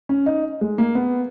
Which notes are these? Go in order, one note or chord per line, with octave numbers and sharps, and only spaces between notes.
C#4
D#4
G#3
A#3
B3